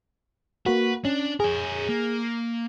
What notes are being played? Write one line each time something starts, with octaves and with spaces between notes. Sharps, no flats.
A#3 F#4 B4
C#4 D4
G#4 A#4 C#5
A#3